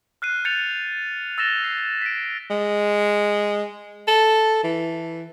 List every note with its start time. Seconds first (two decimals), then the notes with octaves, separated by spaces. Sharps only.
0.22 F6 F#6 C7 D#7
0.45 G6 A6 C#7 D#7 F7
1.38 E6 A6 A#6 E7 G7
1.64 C7
2.02 B6 D7
2.50 G#3
4.08 A4
4.64 E3